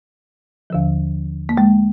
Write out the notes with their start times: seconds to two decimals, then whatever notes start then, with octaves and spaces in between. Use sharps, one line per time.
0.70 D#2 D3 F3
1.49 A#3
1.57 G#3